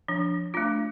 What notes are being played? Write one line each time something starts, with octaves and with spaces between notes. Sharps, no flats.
F3 D4
A3 D4 F4